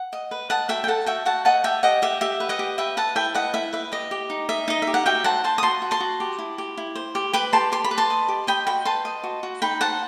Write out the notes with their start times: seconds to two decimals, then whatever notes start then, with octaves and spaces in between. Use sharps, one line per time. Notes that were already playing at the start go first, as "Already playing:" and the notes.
Already playing: F#5
0.13 D#5
0.31 B4
0.50 D#5 F#5 A5
0.69 F#4 E5 G5
0.84 G5
0.87 A4 F#5 A5
1.06 F#4 E5 G5
1.25 F#4 F#5 A5
1.45 D#5 F#5 A5
1.64 G4 E5 G5
1.83 G4 D#5 F#5
2.02 G4 E5
2.21 G4 E5
2.40 B4
2.49 D#5 F#5
2.59 G4
2.78 B4 E5 G5
2.97 B4 F#5 A5
3.15 E4 E5 G5
3.34 B4 D#5 F#5
3.54 E4 E5
3.73 B4 E5
3.92 G4 D#5
4.11 G4
4.30 D#4
4.49 D#5 E5
4.68 D#4 D#5
4.82 E5
4.87 G4
4.94 F#5
5.06 F#4 E5 G5
5.24 C5 F#5 A5
5.44 C5 A5 C6
5.58 D#6
5.63 F#4 A5 C6
5.82 F#4
5.91 A5 C6
6.00 F#4
6.20 G4
6.39 E4
6.58 G4
6.77 E4
6.95 C5
7.15 G4
7.33 B4 G5 B5
7.53 G4 A5 C6
7.72 G4 C6
7.84 B5
7.91 B4
7.98 A5 C6
8.10 D#5
8.28 G4
8.47 D#5 G5 B5
8.67 F#4 G5 B5
8.85 B4 A5 C6
9.05 D#5
9.24 F#4
9.43 F#4
9.62 D#4 G5 B5
9.81 C5 F#5 A5